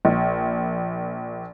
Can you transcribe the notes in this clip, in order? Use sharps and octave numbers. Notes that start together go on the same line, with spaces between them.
A#1